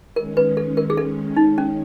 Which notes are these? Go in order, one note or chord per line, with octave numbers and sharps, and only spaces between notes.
D#3 G#3 C#4 A#4
B4
A4
A#4
G#4
A4
D#4
C#4